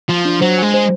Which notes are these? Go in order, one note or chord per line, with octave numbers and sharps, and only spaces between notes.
F3 F4
D4
F#3 C5
G#3 G#5
C5